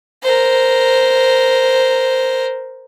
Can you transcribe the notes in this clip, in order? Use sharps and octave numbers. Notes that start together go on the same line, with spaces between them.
A#4 C5